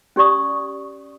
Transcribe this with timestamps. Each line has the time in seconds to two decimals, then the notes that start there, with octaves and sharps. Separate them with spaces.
0.16 C#4 G4 D5 C#6 D#6